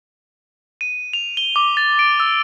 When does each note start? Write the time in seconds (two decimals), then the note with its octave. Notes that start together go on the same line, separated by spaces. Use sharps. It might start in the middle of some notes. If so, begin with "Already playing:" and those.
0.81 D#7
1.13 F7
1.37 G7
1.56 D6
1.77 A6
1.99 D7
2.20 E6